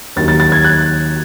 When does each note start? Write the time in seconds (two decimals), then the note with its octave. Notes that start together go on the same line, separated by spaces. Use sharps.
0.16 D#2 D#3 F#3 A6
0.28 A6
0.40 A6
0.52 G#6
0.64 F#6